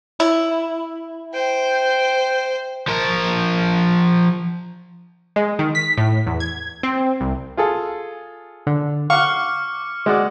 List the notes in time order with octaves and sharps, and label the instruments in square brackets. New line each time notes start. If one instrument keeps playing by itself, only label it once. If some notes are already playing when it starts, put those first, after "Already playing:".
[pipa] E4
[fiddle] C5 [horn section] G5
[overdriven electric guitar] F3 A#4
[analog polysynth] G#3
D#3
B6
A2
E2
G#6
C4
C2
[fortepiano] F4 G#4 A4
[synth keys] D3
[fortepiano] F5 F#5 [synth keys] C#6 [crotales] D6 F6
[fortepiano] G#3 F#4 D5